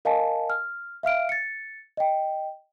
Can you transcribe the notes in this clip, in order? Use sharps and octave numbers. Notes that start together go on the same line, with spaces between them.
A#4 D#5 F5 G#5 A5
F6
E5 F5 F6 D7
A6 C#7
D#5 G5